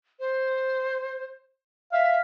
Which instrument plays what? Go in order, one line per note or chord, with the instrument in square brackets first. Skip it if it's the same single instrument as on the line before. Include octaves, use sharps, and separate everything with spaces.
[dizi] C5
[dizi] E5 [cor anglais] F5